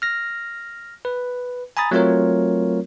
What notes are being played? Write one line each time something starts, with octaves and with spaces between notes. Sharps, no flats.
F6 A#6
B4
G#5 A#5 B5 D#6 A6
F#3 A3 C4 F4 A#4 C#5